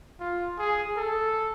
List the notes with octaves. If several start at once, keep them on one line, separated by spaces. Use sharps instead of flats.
F4
G#4
A4